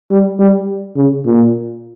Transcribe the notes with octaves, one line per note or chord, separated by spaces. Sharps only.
G3
G3
C#3
A#2